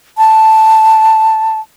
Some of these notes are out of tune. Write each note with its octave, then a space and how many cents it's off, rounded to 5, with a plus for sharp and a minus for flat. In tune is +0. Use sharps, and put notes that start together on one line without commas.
A5 +0